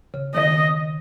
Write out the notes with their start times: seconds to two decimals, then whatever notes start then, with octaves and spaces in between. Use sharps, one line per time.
0.14 C#3
0.35 D#3 D#5